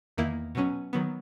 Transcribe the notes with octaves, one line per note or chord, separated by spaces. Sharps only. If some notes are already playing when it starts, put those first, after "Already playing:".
E2 D#3 A#3 E4
B2 F#3 C#4
D#3 F#3 B3